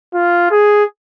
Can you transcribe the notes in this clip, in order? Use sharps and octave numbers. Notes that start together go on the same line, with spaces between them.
F4
G#4